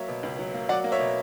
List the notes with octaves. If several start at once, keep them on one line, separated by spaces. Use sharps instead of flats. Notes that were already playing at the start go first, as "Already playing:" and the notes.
Already playing: F#3 A#3 C#5 E5
B2
C#2
F#3
A#3
F#3 D5 F#5
A#3
C#5 E5
B2